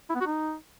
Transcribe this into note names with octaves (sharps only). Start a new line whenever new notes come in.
E4
B3
F#4
D#4